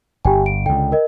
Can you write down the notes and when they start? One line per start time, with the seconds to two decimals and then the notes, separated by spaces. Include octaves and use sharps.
0.25 G1 G4 G5 G#5
0.46 D7
0.66 C#2 D3 G5
0.92 A#4 D#5